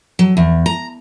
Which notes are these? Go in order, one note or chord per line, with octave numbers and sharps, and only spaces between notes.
F#3
E2
A#5